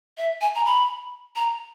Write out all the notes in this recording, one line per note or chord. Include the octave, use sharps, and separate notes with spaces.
E5
G#5
A#5
B5
A#5